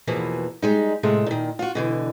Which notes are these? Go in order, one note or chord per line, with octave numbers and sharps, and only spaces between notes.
E2 B2 E3 F3 A#3
G3 G#3 D#4
A2 C3 G#3 A3
A#2 D#3
F4 F#4
B2 D3 E3